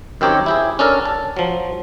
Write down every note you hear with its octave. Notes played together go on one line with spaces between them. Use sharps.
F#2 D#3 C4 G4 C#5 A#5
E4 G4 G#4
C#4 D4 A4 A#4
A5
F3 F#3